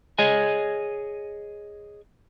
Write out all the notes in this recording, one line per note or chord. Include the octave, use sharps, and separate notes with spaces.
G#4 C#5 D#5 G#5